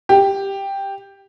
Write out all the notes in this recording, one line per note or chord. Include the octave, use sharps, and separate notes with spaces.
G4